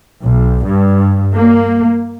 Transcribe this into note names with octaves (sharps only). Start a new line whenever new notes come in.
B1
G2
A#3